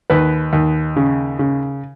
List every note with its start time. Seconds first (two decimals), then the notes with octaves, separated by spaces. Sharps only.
0.10 D#2 B4
0.53 D#2
0.96 C#3
1.39 C#3